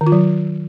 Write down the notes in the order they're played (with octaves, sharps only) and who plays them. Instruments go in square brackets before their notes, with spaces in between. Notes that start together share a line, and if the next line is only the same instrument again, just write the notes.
[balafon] D#3
F4
F#3